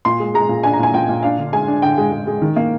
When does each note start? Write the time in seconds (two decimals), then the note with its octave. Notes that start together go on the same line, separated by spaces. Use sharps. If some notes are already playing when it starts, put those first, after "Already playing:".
0.05 A#2 C6
0.20 G#3
0.34 G#3 A#5
0.49 A#2
0.63 D4 G#5
0.73 A#5
0.79 A#2 G#5
0.94 A#2 G5
1.09 A#2
1.23 D4 F5
1.38 D3
1.53 G#3 G#5
1.68 D4
1.82 D3 G5
1.98 G#3
2.12 G#3
2.27 G#3
2.42 D#3
2.56 A#3